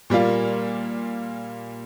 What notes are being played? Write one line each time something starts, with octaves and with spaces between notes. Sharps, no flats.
A#2 G3 A#3 F4